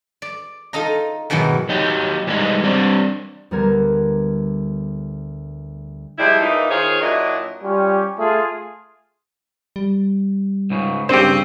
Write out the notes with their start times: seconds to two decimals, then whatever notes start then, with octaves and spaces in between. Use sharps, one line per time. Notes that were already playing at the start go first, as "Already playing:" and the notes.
0.22 D5
0.73 D#4 F4 A4 D#5 A#5
1.30 G#2 B2 D#3 E3 F#3
1.69 F#3 D#4 G4
2.27 E3 G3 G#3 D#4
2.63 G3 C4 D4
3.51 D2 G3 B3 A#4 G#6
6.18 F3 G3 G#3 E4
6.41 A#2 E3 A#3 D#4
6.70 D#3 F4 G#4 C5 C#5
7.02 A#2 F#3 D4 E4 D#5
7.62 G3 C#4 F4 G4
8.18 A3 F4 G#4
9.76 G3
10.70 C#2 G#2 C#3
11.09 G2 C#3 C4 D4 G4 C5